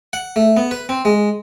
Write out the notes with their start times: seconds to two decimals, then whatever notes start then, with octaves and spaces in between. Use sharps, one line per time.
0.13 F#5
0.36 A3
0.57 B3
0.71 B4
0.89 C4
1.05 G#3